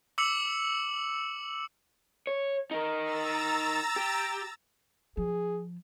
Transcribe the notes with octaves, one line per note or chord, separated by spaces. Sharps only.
D6 E6 C#7 F#7
C#5
D#4 A#4
A#5 E6 A6
G4
F3 G#4